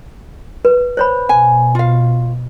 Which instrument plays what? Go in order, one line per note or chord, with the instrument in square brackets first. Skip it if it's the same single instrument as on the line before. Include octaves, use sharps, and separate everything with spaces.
[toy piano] B4
C5 C#5 B5
[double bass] B2 [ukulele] G#5
[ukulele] F4 F5